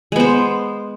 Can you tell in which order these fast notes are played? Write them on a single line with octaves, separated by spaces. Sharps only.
G#3 B3 C5